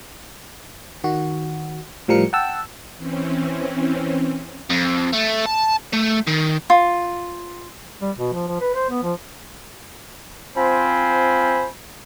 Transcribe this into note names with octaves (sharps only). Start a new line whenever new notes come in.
D#3 F#4
A2 F3 G3 A#4 C#7
F#5 G5 A5 E6
E3 C4 C#4
F2
A3
A5
A3
D#3
F4
G3
B2
F3
F3
B4
C5
B3
F3
C4 F4 C5 G#5 B5